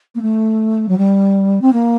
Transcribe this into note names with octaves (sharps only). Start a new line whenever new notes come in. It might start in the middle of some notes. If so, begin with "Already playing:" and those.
A#3
A3
F#3
G3
C4
A#3